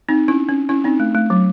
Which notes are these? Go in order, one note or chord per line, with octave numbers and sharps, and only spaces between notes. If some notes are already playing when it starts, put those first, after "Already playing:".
C4 D#4
C#4 E4
C#4
C#4 E4
C4 D#4
A3
A3
F#3